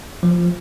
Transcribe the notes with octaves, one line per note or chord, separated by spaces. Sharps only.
F3